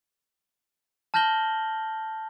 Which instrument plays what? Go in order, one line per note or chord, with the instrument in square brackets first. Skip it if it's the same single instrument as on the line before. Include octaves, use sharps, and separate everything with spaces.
[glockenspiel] A5 F6 G6 A#6 F#7 G7